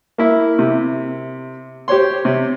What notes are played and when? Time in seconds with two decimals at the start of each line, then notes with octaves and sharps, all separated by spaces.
0.18 A#3 E4
0.59 C3
1.88 G4 C5 C#5 C6
2.25 C3